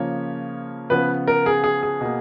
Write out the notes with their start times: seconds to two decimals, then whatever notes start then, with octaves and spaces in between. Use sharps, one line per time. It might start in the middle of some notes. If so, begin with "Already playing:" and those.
Already playing: C#3 F3 A#3 C#5
0.90 C#3 F3 B3 B4
1.27 A#4
1.46 G#4
1.64 G#4
1.83 G#4
2.01 B2 A#3